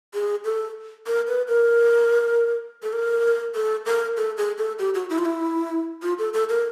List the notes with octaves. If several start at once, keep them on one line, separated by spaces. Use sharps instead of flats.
G#4
A4
A#4
B4
A#4
A4
A#4
A4
A#4
A4
G#4
A4
G4
F#4
E4
F4
E4
F4
A4
A4
A#4